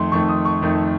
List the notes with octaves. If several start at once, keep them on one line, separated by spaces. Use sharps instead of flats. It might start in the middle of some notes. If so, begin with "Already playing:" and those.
Already playing: F2 D#3 A3 C6
F2 D#3 A3 C#6
D#6
C#6
F2 D#3 A3